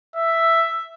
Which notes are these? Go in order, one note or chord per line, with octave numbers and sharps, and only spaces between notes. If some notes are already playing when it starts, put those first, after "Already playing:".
E5